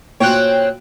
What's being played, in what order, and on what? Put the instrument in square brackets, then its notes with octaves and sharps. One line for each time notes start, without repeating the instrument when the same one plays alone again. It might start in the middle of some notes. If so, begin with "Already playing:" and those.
[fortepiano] A#2 F#4 [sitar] C4 C#4 C#5 [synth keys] G5 F#6